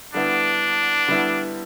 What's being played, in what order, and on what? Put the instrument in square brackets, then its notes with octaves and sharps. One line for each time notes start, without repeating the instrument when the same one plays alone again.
[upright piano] D3 G3 B3 E4 [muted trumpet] D4
[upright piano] D3 G3 B3 E4